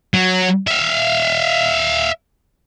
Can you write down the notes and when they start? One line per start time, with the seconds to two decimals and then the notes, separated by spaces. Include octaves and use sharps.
0.14 F#3
0.67 E5 F5